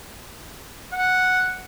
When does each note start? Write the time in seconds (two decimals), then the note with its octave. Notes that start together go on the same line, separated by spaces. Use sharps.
0.92 F#5